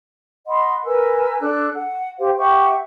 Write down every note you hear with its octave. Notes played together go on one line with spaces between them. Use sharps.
D#5 F#5 B5 C6
A#4 B4 G#5 E6
D4 A4 E6 F#6
F#5
G4 C5 F5
G4 E5 F#5 C#6